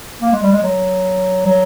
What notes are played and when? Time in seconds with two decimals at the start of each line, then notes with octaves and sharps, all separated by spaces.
0.22 A#3
0.33 G#3
0.43 G3
0.52 G#3
0.63 F#3
1.46 F#3